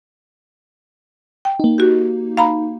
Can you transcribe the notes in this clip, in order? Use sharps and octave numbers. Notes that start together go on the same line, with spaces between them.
G5
A#3 D#4
F#4 G4
F5 A#5 B5